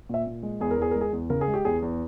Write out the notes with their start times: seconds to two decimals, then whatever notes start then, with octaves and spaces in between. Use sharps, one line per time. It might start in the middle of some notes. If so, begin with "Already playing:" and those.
0.09 A#2 E5
0.27 A#2
0.43 G#3
0.60 E2 G#4
0.71 A#4
0.78 E2 G#4
0.91 G#3 A#4
1.01 G#4
1.13 E2
1.30 C#3 A#4
1.41 G#4
1.48 G#3
1.54 G4
1.65 E2 G#4
1.82 E2